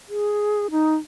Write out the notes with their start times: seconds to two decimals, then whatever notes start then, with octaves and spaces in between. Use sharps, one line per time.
0.09 G#4
0.71 D#4